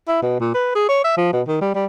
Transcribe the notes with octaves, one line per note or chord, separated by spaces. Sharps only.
E4
B2
A#2
B4
G#4
C#5
E5
F3
B2
D#3
G3
G3